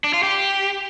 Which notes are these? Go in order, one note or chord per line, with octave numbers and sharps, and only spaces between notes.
D4
F4
G4